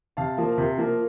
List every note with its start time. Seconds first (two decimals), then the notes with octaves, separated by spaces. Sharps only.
0.17 C3 F5 A5
0.38 F3 A#3
0.58 C3
0.78 F3 A#3